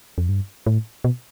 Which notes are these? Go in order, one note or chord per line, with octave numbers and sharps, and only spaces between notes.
F2
G2
A2
B2